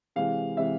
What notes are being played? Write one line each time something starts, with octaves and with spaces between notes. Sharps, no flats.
C3 E3 G#3 F5
C3 E3 G#3 E5